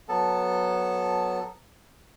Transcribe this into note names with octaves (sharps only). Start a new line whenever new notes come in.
F#3 B3 A4 A5